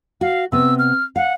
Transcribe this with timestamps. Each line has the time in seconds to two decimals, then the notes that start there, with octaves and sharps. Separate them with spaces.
0.21 F#4 F5
0.52 C3 B3 E6
0.79 F6
1.16 F5 F#5